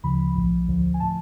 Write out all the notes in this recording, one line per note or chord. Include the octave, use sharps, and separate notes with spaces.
D2 C#3 F3 B5
B1 A2 F3
D2 D3 F3
G#5
A2 F3 A5